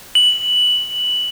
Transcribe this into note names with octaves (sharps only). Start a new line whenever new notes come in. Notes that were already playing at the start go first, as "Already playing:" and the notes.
F#7